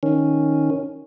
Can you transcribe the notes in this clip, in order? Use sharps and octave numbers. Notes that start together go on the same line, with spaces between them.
D#3 C#4